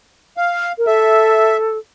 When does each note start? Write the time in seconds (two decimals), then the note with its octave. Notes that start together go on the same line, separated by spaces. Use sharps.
0.37 F5
0.78 A#4
0.87 A4 E5